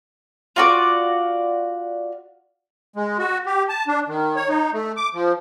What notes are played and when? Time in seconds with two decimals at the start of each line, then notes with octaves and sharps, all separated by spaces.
0.56 F4 F#4 D5 F#5
2.96 G#3
3.18 F#4
3.46 G4
3.69 A5
3.88 D4
4.08 D#3
4.36 C#5
4.49 D#4
4.73 A3
4.97 D6
5.14 F3